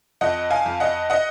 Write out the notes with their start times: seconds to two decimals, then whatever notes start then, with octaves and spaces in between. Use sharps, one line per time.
0.21 F2 D#5 F#5
0.50 F5 G#5
0.66 F2
0.80 D#5 F#5
1.10 D#5 F#5